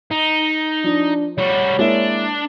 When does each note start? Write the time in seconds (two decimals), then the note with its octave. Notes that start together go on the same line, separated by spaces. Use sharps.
0.11 D#4
0.84 F3 D4
1.38 G3 F#4 C#5
1.79 G#3 A#3 D4 E4